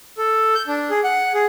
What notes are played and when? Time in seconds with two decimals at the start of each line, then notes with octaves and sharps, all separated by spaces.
0.18 A4
0.55 G6
0.67 D4
0.90 G#4
1.04 F#5
1.34 G#4